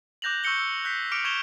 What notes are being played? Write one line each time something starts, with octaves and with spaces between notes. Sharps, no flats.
D6 F#6 G6 A#6 F7 F#7
C#6 E6 G6 C#7 G7
E6
F#6 G6 B6 C7
D6 E6 F6 C#7 D7 F7
C#6 G#6 E7 F7 G7